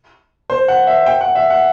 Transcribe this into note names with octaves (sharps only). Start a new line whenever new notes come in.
C5
F#5
E5
G5
F#5
E5
F#5